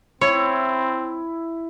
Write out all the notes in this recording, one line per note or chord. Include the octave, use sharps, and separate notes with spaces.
C4 E4 C#5